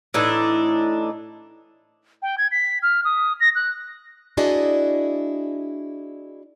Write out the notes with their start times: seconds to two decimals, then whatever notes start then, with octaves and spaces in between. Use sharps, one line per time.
0.14 A2 E3 D4 D#4
2.22 G5
2.38 G#6
2.52 B6
2.83 F6
3.05 D#6
3.40 A#6
3.55 F#6
4.37 D4 E4 F#4 G#4 D5 D#5